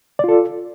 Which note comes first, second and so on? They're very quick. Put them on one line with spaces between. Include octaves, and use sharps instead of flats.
D5 F4 A4